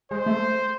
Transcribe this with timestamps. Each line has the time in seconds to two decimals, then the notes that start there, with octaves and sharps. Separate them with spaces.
0.11 G#3 C5
0.26 A3